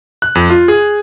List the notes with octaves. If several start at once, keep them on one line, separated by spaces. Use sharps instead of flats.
F#6
F2
F4
G#4